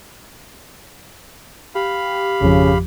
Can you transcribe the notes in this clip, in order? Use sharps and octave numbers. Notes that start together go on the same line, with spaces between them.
G4 F5 B5
G#1 F2 C#3 F3